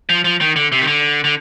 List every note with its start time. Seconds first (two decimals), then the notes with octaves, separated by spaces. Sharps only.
0.09 F3
0.24 F3
0.41 D#3
0.56 D3
0.72 C3
0.81 D#3
0.87 D3
1.24 D3